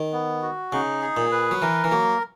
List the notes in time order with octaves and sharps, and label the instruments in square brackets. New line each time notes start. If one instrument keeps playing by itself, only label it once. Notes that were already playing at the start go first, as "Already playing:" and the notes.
Already playing: [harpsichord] D#3
[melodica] B3
F#4
[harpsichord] C#3 [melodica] D#4
[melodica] G#4
[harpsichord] A#2
[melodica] B4
[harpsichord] F#3
[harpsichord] E3 [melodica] A#4
[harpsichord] E3
[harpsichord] F#3 [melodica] A#3